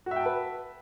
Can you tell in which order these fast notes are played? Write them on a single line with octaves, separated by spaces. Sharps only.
F#4 E5 G5 A5 B4